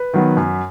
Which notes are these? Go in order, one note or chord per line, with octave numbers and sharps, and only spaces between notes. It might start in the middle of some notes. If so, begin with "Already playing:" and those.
Already playing: B4
D#3 F#3 B3
F#2